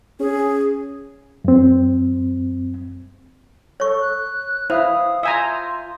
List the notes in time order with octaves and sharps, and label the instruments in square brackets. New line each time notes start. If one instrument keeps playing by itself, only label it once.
[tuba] C#4 [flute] G#4
[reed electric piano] F#2 C4
[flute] A4 [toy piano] C#5 C#6
[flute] F#6
[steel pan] E4 [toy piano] C5 [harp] E5 F5 [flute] D#6
[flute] F4 [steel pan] E5 G#5 A#5 [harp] D#6 G6 G#6